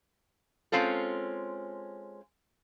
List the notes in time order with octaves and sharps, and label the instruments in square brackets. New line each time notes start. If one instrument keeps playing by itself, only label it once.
[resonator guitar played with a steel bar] G#3 C4 C#4 F4 A4